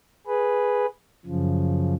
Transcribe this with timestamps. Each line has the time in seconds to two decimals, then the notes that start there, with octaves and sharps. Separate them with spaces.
0.27 G#4 B4
1.25 F#2 C#3 F3